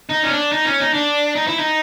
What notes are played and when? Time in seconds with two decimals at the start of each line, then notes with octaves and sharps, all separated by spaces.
0.09 D#4
0.23 C#4
0.31 D4
0.52 D#4
0.65 C#4
0.80 D#4
0.93 D4
1.36 D#4
1.47 E4
1.59 D#4